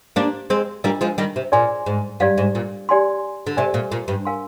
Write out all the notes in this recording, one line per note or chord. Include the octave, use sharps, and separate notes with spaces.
A#3 D4 G4 C5 F5
G#3 C4
G3 A#3 D4 F4 A#4 D#5
F3 G#3
D#3 G3
C3
A#2 G#4 D5 G#5 C6
G#2
G2 G4 D5 F5
G#2
A#2
G4 D5 G#5 C6
D3
C3 G4 D5 G#5
A#2
A#2
G2
A#4 F5 G#5 C6